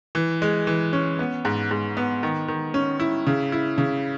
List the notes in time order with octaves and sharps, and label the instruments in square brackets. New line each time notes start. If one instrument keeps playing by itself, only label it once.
[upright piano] E3
G#3
E3
C#4
B3
G#2
G#2
B3
D#3
D#3
C#4
E4
C#3
E4
C#3